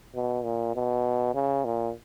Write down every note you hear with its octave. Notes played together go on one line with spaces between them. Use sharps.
B2
A#2
B2
C#3
A#2